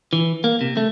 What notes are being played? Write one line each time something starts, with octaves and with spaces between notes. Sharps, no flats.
E3
A#3
C3
A3